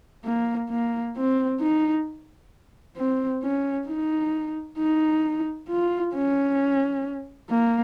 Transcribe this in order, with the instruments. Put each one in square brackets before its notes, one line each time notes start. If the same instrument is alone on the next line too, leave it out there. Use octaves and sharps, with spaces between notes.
[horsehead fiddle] A#3
A#3
C4
D#4
C4
C#4
D#4
D#4
F4
C#4
A#3